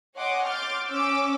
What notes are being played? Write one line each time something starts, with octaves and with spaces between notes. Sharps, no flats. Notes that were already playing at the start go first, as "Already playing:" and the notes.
C#5 D#5 F#5 G#5 C6 D6
C6 D6 F6 G6 A6
C#4 D6 E6